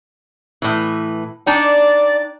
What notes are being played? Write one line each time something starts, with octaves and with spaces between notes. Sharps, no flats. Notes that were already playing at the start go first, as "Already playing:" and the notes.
A2 E3
D4 D#4 D5 G5